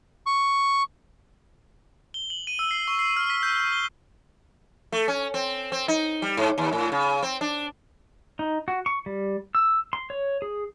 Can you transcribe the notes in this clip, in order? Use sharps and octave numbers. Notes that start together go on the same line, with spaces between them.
C#6
G7
F#7
D#7
E6
C7
C#6
C7
F6
B6
G6
G6
G7
A3
C#4
C4
C4
D#4
G3
G#2
D#2
A2
C#3
C4
D4
D#4
F#4
C#6
G3
E6
C6
C#5
G#4